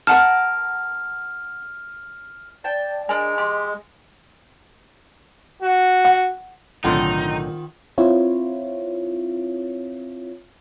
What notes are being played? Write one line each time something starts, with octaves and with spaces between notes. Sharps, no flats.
A#4 F#5 A5 F6
D5 G5 A5
G#3 D4 A#4 G#5
G4 D#5 C6
F#4
F#5
B1 A2 D3 D#3 C4 D#4 F4 F#5
C4 E4 F4 C#5